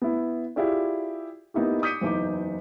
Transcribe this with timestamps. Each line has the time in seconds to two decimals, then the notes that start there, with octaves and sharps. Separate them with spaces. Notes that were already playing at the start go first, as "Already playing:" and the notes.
0.02 B3 E4
0.56 E4 F4 G4 G#4 D5
1.54 A#3 B3 D#4 E4 G4
1.82 D6 D#6 G6 B6 C#7 D#7
2.01 F#1 E2 D#4 D6